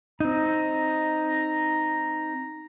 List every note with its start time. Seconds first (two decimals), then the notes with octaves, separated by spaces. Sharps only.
0.20 C4 D#4 A#5